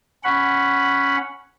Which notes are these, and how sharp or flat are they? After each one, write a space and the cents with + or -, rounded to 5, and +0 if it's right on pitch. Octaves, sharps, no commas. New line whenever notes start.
C#4 +0 F#5 +0 B5 +0